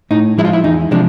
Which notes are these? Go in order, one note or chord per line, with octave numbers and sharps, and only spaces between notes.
A2 D#4
F3 G#3 E4
F4
E4
E2 D#4
C3 F3 G#3 D4